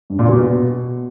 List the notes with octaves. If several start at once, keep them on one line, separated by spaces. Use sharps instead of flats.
G2
A#2
B2